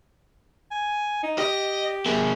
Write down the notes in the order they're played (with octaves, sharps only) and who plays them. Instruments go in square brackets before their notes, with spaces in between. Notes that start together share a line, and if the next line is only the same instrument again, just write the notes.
[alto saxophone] G#5
D#4
[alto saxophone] G4 [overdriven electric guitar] D#5
[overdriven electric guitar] A#3 G#4